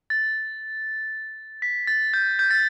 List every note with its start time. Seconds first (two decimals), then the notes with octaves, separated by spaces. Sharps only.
0.10 A6
1.62 B6
1.87 A6
2.14 G6
2.39 G6
2.51 A6